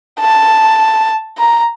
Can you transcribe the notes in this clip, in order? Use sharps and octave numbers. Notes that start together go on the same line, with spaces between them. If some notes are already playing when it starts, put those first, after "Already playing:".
A5
A#5